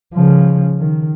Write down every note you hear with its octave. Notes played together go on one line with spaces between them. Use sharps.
C#3 F3
D#3